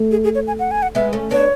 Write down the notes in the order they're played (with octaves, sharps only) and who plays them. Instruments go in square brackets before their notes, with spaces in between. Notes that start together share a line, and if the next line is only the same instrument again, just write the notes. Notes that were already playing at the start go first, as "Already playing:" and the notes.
Already playing: [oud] A3
[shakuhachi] G#4
G#4
C#5
G#5
F#5
G#5
F#5
[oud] G#3 B3 [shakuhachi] E5
[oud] A3 C#4
[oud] B3 D4 [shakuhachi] C#5